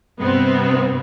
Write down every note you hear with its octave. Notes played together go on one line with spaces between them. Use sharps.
G2 C3 B3 C4